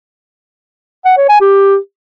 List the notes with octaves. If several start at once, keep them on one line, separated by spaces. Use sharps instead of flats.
F#5
C#5
G#5
G4